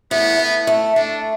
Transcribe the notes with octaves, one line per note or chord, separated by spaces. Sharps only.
A2 B3
A2
A3
A3 D4